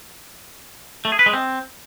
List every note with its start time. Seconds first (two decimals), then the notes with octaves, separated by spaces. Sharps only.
1.05 A3
1.12 G#4
1.19 B4
1.26 G#3
1.33 C4